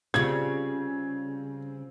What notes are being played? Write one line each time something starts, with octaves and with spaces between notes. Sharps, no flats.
C#3 G3 C4 F4 G#6